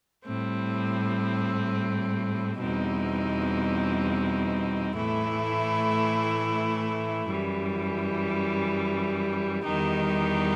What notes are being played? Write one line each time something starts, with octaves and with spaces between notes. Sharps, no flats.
A2 G3 C4
E2 B2 G3 C4 D#4
A2 E3 A3 E4
F#2 E3 G3
E2 D#3 G3 D#4 G4